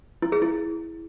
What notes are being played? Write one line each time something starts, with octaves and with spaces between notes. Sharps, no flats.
E4
G#4
E4